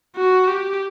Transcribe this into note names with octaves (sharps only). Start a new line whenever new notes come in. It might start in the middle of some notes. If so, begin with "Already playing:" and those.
F#4
G4